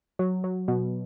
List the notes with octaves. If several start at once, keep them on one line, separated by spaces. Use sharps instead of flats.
F#3
F#3
B2